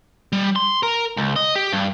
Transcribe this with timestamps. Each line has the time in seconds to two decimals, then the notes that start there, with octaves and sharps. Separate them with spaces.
0.32 G3
0.56 C6
0.83 A#4
1.17 C#2
1.36 D#5
1.56 G4
1.73 G2